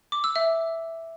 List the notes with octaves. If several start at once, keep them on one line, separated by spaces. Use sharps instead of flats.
D6
E6
E5